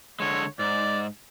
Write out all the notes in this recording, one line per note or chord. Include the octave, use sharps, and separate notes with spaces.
D3 G#3 C#5
G#2 D5